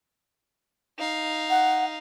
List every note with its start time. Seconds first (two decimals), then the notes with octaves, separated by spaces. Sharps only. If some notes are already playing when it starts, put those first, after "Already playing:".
0.98 D#4 F5
1.50 F#5